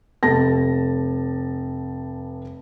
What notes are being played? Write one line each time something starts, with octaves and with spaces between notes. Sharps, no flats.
F1 A5 A#6